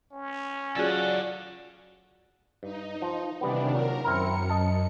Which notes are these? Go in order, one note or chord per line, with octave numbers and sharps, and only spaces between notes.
C#4
F#3 F4 G#4 A4 D5 F#5
G2 D#4
F3
C3 D#3 E3 G3 B3 D4
A#2 F#3 A#4
F#2 C4 E4 A#4 C#7
D#5 A5